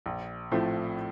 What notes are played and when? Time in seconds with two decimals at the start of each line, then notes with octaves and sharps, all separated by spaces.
0.06 A#1
0.51 A2 F3 A3 C4